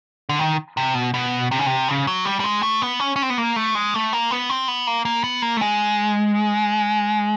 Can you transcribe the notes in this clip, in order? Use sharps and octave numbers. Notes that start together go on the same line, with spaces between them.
D3
D#3
C3
B2
B2
C3
C#3
C3
C#3
F#3
G3
G3
G#3
A3
B3
C#4
C#4
C4
B3
A#3
A3
G#3
A3
A#3
B3
C4
B3
A#3
A#3
B3
A#3
A3
G#3